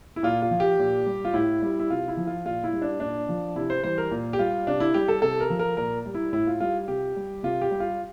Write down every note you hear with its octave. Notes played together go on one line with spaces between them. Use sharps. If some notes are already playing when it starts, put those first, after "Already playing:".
E4
A#2 F4
F4
F3
G4
A#2
G3
F4
A2 E4
G3
E4
C3 F4
E4
F3
F4
A#2 F4
E4
G3
D4
A#2 D4
F3
C3 E4
C5
E3 G3 C5
A#4
A#2
G4
G3 F4
C3 D4
E4
G3 G4
A4
C3 A4
A#4
F3
A#4
A#2 A#4
G3
E4
A2 E4
F4
G3 F4
C3 G4
G3
C3 F4
G4
G3
F4